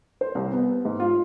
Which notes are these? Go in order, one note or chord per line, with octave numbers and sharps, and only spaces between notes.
C5
C2
B3
G#2
F4